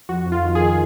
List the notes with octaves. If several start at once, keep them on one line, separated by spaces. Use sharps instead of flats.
F2 F#4
F2
F4
D#3
G#4
D#3